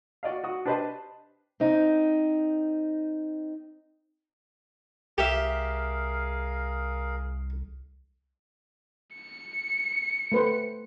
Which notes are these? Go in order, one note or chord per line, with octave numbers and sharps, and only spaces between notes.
F#4 D5 D#5 F5
F#4 D#6
D4 G4 B4 C5 D#5 A5
C4 D#4
C2 G4 G#4 A#4 E5 F5
C#7
A3 B4 C5